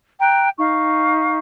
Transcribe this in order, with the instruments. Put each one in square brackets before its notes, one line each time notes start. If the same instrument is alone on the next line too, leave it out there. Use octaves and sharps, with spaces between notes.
[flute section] G5 A#5 F#6
D#4 F5 C#6